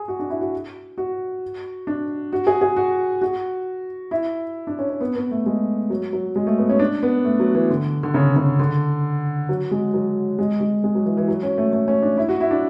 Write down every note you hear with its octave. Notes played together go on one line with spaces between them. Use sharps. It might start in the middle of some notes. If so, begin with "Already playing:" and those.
Already playing: G#4
F#4
D4
E4
F#4
F#4
D4
F#4
G#4
G#4
F#4
F#4
E4
D4
C#4
C#4
B3
B3
A3
G#3
F#3
F#3
G#3
A3
B3
C#4
D4
B3
A3
F#3
E3
D3
D3
C#3
C#3
D3
F#3
G#3
F#3
G#3
G#3
G#3
F#3
E3
E3
F#3
C#4
A3
A3
C#4
D4
E4
F#4
E4
D4